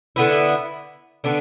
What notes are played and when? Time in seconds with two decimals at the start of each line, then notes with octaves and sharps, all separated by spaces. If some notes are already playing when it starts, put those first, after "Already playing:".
0.16 D3 B3 E4
1.24 D3 B3 D4